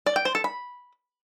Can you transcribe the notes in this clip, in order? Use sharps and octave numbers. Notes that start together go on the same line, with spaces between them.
D5
G5
C5
A4
B5